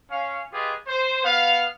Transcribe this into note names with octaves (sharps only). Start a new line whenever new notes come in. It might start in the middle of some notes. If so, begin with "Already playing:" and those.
C#4 F5
F4 G4 G#4 B4 D#5
C5
B3 F5